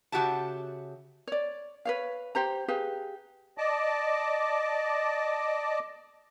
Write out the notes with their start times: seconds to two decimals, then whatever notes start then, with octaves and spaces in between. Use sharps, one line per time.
0.12 C#3 F#4 G4 E5 A5
1.27 C#5 D5
1.85 B4 C#5 F5
2.35 G4 C5 A#5
2.68 G4 G#4 B4 F5
3.58 D5 D#5 A5 D6